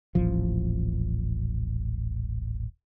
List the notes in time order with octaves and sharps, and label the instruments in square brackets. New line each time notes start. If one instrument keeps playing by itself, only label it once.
[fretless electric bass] D#1 A1 F3